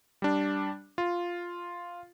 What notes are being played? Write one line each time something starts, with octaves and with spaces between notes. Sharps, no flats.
G3 D4
F4